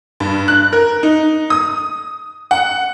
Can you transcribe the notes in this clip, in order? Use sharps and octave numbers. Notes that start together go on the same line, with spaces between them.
G2
F#6
A#4
D#4
D#6
F#5